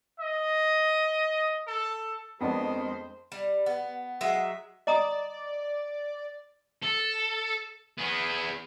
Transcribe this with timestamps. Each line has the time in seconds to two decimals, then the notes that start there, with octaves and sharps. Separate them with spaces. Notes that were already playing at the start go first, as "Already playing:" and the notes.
0.20 D#5
1.67 A4
2.41 F2 D#3 G#3 B3 D4 C5 A5
3.32 G3
3.66 B3
4.21 F#3 G#3 E5
4.87 D5 D#5 A#5 D#6
6.83 A4
7.98 B3 G#4